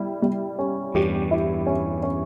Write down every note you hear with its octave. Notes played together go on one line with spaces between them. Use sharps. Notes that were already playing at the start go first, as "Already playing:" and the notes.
Already playing: G3 E4
G3
C#4
E2 G2 G4
E4
C#4
C#4